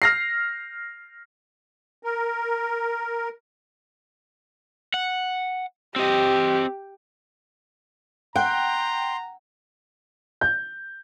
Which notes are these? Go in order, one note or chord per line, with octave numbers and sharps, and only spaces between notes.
F6 A#6 C7
A#4
F#5
C4 G4 D#5
F#5 G5 A#5 C6
G6